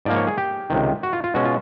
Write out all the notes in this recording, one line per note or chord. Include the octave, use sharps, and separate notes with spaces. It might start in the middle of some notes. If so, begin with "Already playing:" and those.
G#2 F3 A#3 D5
C#5
G#4
G4
C#2 C3 D#3
F#4
F4
F4
B2 G#3 C#4 F#4
F4